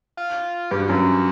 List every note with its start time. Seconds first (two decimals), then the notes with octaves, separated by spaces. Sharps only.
0.17 F4
0.71 G2 G4
0.80 F#4
0.88 F#2 F4
0.96 F#4